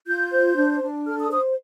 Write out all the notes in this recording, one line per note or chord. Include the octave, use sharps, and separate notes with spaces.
F4 G6
C5
D4
D4
A4 F6
D#6
C5 D#6